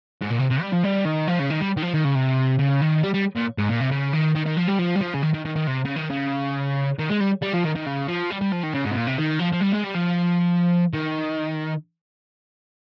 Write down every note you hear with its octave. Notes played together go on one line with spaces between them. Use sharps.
G#2
A#2
C3
C3
G3
F3
G3
D#3
F3
C#3
D#3
G3
D#3
F3
D#3
C#3
C3
C#3
D#3
G3
G3
A#2
G#2
A#2
C3
C#3
D#3
D#3
D#3
F3
G3
F3
G3
F3
C#3
D#3
D#3
D#3
D#3
C3
C#3
D#3
C#3
D#3
G#3
G3
G3
F3
D#3
D#3
C#3
F3
G3
G3
F3
D#3
C#3
G#2
C3
A#2
C3
D#3
F3
F3
G3
G#3
G3
F3
D#3